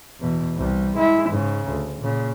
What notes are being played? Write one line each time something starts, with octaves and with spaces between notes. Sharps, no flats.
E2 B2
C2 G3
G#3 E4
G#2 C#3
D2
A#2 C#3